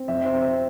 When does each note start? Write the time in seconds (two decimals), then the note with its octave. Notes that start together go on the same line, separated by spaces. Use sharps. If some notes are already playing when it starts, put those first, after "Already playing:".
Already playing: C4
0.08 F2 C5 E5
0.25 C5
0.33 C4
0.41 C5